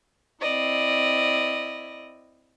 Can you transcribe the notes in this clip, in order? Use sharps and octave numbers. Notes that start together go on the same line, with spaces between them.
C4 E4 D5 D#5